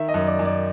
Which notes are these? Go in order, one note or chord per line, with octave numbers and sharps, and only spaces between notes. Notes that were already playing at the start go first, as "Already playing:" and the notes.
Already playing: D#3 E5
D#5
F#2
D5
F#2
D5